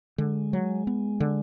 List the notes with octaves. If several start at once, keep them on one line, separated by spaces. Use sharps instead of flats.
D3 G#3
F#3
B3
D3